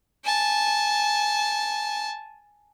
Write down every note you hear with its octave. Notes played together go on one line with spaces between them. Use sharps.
G#5 A5